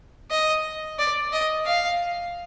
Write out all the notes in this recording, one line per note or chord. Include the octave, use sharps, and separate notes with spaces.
D#5
D5
D#5
F5